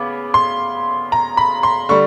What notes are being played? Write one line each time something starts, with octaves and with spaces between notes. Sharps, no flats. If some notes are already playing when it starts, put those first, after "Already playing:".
Already playing: C#3 B3 D6
C6
A#5
B5
C6
D3 G3 C#6